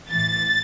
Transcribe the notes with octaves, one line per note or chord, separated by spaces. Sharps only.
A2 E3 A6